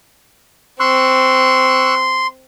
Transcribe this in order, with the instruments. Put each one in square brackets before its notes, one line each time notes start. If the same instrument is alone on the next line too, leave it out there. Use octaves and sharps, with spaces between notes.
[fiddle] C4 [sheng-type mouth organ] C6 [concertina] C#6 E6 F#6